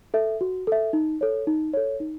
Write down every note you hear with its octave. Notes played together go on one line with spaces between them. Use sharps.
A4 E5
F#4
A4 E5
D#4
A4 C#5
D#4
A4 C#5
D#4